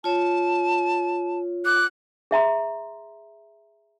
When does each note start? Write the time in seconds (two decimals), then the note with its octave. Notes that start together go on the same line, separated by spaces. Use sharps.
0.04 F4 C#5 A5
1.65 D6 F#6
2.31 G#4 E5 A#5 C6